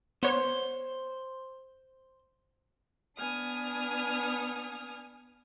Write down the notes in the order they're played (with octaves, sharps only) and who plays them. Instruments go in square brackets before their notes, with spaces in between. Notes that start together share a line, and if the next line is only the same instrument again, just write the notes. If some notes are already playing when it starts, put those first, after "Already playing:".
[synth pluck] B3 C#5 [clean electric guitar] C5
[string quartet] B3 D4 G#5 D#6 F6